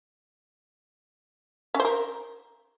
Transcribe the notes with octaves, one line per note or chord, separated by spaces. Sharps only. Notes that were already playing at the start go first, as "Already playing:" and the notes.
C#4
C5
A#4